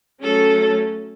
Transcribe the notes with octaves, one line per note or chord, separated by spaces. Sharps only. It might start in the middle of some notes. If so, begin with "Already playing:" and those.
F#3 A3 C#4 A4